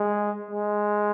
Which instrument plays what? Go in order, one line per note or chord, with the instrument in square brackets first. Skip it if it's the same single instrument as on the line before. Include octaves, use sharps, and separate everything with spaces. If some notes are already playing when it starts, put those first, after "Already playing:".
Already playing: [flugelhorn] G#3
G#3